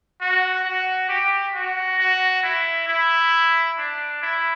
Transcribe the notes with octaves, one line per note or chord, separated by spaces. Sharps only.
F#4
F#4
G4
F#4
F#4
E4
E4
D4
E4